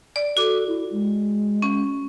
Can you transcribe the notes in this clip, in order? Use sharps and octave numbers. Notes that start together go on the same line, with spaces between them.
D5
F#4 A4 D6
E4
G#3
C#4